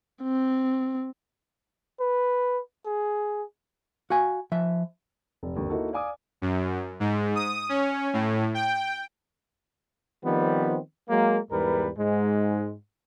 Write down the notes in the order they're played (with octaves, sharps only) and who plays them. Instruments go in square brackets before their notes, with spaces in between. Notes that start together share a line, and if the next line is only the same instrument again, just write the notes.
[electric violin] C4
[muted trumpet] B4
G#4
[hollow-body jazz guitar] F#4 F5 G#5
F3 E5
[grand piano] F1
G1 D#2 D3
A#3 D#4 E4 F#4 A4
D5 F5 G#5 D6 D#6
[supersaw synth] F#2
G#2
D#6
C#4
A2
G5
[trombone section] D#3 F3 G3 B3 C4
F#3 G#3 A#3
E2 G#2 G3 A#4 B4
G#2 G#3